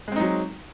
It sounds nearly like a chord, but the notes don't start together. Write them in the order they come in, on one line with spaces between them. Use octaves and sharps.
G#3 C4 D#4 F#3